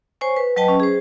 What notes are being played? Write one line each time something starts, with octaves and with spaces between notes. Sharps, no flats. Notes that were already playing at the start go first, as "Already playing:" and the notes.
C5 C#5 G#5 C#6
B4
F#3 B4 D#5 G5 A5
C#4
G#4 C5